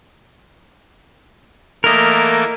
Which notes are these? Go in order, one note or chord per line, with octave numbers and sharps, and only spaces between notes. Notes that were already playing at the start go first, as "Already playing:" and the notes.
E3 A3 A#3 A#4 D#5